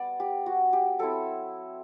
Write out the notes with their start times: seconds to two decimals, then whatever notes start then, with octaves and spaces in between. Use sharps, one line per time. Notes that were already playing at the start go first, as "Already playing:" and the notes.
Already playing: G3 B3 D5
0.20 G4
0.46 F#4
0.73 G4
0.99 F#3 C4 E4 A4